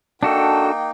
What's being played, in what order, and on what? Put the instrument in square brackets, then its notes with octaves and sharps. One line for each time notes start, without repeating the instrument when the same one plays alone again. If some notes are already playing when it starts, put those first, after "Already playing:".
[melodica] A#3 D#4 [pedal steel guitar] D4 F#4 A4 [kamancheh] G5